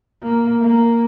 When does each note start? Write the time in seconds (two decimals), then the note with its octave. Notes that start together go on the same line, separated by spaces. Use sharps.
0.22 A#3
0.61 A#3